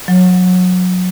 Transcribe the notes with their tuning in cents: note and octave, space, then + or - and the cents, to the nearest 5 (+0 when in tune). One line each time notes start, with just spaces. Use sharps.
F#3 -25